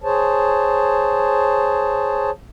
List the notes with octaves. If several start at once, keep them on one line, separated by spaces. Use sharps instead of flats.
G#4 C5 C#5 A5